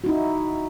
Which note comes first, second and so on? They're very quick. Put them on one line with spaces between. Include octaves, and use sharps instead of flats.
F#4 D#4 E4